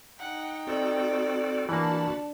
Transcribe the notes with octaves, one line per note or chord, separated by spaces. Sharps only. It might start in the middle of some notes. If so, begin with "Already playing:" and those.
D#4 F#5 G5
C4 F#4 A4 D5
E3 A#3 D4 F#4 A5 B5